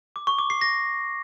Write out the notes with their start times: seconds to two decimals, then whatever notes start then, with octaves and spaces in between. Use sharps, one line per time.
0.16 D6
0.27 C#6
0.39 D6
0.50 C7
0.61 A#6